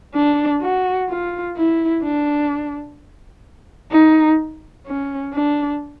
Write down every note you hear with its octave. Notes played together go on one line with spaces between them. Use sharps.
D4
F#4
F4
E4
D4
D#4
C#4
D4